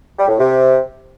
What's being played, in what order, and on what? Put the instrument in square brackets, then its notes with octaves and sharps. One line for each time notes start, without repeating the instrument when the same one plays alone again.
[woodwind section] G3
A2
C3